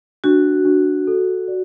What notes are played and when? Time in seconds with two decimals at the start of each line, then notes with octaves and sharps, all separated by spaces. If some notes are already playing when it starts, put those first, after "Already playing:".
0.24 D4 F#4
0.65 D4
1.07 A4
1.48 D5